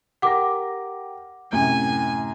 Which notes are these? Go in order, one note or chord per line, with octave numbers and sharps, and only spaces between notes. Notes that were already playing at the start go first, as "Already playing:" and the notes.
G4 A#4 F#5 D6 A#6
F#2 A2 C3 G#5